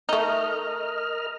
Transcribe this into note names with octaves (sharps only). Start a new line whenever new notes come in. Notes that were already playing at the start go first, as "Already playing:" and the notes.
A3 D#4 A#4 D#5 F6